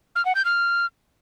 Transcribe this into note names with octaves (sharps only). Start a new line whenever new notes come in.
F6
F#5
G6
F6